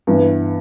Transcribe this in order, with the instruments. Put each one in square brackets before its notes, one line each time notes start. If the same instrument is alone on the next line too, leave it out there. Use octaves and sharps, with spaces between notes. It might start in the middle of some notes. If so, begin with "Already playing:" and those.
[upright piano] G2 E3 B3